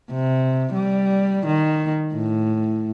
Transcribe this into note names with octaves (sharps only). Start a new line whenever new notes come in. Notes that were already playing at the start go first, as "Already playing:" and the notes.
C3
G3
D#3
A2